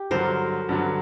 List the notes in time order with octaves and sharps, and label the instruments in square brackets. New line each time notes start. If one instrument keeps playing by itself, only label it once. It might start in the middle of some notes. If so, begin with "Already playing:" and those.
Already playing: [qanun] G4
[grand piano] G2 D3 F#3 [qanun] A#4 C5
[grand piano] G2 D3 F#3